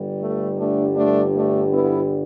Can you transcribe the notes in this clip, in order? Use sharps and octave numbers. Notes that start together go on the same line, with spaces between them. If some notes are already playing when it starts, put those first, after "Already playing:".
Already playing: G1 G2 D3 G3
A3
A3 D4
A3 D4
A3 D4
B3 E4